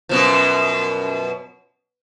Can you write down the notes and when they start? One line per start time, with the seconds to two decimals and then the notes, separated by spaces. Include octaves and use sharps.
0.09 F#2 B2 F3